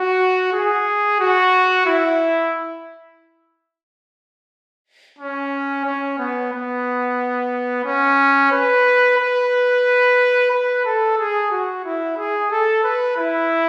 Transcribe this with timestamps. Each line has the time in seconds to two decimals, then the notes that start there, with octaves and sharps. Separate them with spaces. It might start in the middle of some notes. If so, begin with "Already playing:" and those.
Already playing: F#4
0.53 G#4
1.20 F#4
1.86 E4
5.18 C#4
5.85 C#4
6.18 B3
6.52 B3
7.85 C#4
8.51 B4
9.18 B4
10.51 B4
10.85 A4
11.17 G#4
11.51 F#4
11.85 E4
12.17 G#4
12.51 A4
12.83 B4
13.17 E4